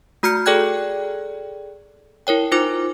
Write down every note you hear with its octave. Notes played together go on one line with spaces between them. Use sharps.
A3 F#4 A#5 F6 G6 C#7
G#4 A4 D5 G5 F#6 G#6
E4 A#4 C#5 G5
D#4 F4 C5 D6